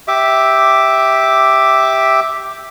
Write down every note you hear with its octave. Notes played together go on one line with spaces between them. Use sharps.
G4 E5 D6